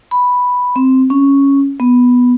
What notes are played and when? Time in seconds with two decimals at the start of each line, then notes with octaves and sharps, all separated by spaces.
0.11 B5
0.76 C4
1.10 C#4
1.80 B3